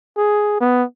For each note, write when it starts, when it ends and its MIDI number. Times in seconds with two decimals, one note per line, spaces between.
0.17 0.56 68
0.61 0.84 59